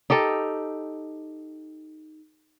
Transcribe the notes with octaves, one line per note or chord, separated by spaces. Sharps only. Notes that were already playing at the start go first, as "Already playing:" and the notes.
D#4 G4 A4 D#5